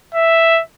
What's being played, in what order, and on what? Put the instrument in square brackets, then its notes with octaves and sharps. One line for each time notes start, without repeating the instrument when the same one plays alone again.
[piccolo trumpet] E5